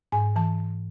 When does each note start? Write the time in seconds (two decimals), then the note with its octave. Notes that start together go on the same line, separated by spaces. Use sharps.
0.12 G#2 G#5
0.36 E3 A5